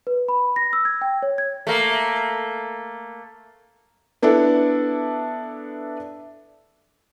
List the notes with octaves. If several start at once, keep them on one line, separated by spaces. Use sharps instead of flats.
B4
B5
A#6
E6
G#6
G5
C#5
G#6
A3 A#3
B3 D4 E4 A4